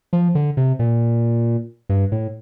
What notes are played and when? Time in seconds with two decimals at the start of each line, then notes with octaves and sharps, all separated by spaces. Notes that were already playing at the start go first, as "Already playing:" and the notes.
0.13 F3
0.35 D3
0.57 C3
0.79 A#2
1.89 G2
2.12 A2